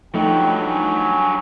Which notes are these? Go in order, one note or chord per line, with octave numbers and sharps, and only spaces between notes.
G2 F3 F#3 A3 D#4 G5
G#5